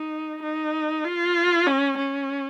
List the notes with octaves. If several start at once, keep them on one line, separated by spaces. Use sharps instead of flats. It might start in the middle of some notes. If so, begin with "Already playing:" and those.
Already playing: D#4
D#4
F4
C#4
C#4